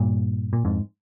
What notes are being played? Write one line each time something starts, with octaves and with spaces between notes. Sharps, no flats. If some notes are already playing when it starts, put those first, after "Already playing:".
Already playing: G2 A#2
A#2
F2 G#2